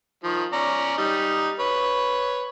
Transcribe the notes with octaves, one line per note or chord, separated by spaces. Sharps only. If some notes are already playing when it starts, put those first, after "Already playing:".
D#3 F3
C#4 D5 A#5
G3 D#4
B4 C#5